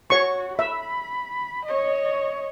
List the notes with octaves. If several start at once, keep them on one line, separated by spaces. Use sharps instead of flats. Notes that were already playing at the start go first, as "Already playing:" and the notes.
F#4 C#5 C#6
E5 B5
C#5 D#5